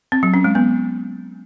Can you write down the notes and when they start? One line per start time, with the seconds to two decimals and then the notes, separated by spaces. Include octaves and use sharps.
0.12 C4
0.23 F#3
0.34 C#4
0.44 G#3
0.55 B3